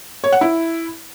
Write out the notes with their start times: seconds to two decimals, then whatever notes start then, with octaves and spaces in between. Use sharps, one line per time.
0.24 C#5
0.32 F#5
0.41 E4